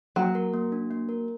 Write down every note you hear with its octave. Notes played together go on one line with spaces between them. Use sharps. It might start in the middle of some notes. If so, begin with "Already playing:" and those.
F#3 A#3
A#4
A#3
D4
A#3
A#4